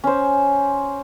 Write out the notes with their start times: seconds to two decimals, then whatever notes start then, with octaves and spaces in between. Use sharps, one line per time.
0.04 C#4 C5